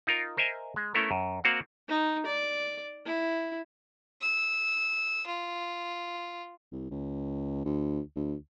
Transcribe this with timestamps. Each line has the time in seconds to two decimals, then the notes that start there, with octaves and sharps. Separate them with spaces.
0.07 D#4 F4 A#4
0.37 A#4 C5 D#5 E5 G#5
0.76 G#3
0.94 A3 B3 C#4 E4 A4 A#4
1.11 F#2
1.44 A#3 C4 F#4 F5 F#5
1.88 D#4
2.26 D5
3.06 E4
4.21 E6
5.26 F4
6.72 C2
6.91 C#2
7.65 D2
8.16 D2